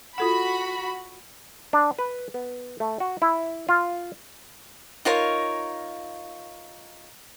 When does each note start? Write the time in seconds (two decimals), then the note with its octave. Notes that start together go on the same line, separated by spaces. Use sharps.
0.18 F4 F#4 A4 F#5 B5
1.73 D4
1.99 B4
2.34 B3
2.80 A3
3.00 F#4
3.22 E4
3.69 F4
5.05 D#4 F4 A#4 C#5